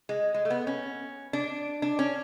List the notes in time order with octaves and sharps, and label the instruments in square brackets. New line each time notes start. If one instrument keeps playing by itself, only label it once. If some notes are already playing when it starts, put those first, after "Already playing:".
[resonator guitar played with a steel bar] G#3
G#3
A3
B3
C#4
D4
D4
C#4